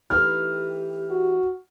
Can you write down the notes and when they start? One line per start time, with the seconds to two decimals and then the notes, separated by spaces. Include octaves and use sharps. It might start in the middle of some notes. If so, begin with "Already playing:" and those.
0.10 E3 A3 D#4 G4 F6
1.10 F#4